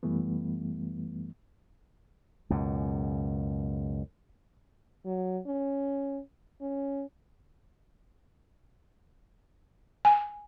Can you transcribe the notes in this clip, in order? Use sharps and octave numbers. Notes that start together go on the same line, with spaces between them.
F#2 E3 G3 A3 B3
C#2 F#2 B2
F#3
C#4
C#4
G#5